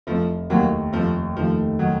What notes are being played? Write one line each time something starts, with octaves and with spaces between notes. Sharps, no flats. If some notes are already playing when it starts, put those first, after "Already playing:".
F1 F3 A3
D#2 D#3 F#3 A3 A#3
F1 F3 A3
D#2 D#3 F3 A3
D#3 F#3